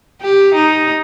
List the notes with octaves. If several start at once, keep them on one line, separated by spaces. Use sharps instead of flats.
G4
D#4